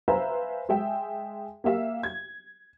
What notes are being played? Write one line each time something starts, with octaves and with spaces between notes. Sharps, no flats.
B4 C5 E5 F5 G#5 A#5
G#3 G#4 E5 G5
A#3 G4 E5 F5
G#6